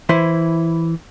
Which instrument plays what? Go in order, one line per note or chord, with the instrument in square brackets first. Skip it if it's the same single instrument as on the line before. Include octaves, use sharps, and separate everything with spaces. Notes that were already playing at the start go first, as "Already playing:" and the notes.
[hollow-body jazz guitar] E3 E4 C5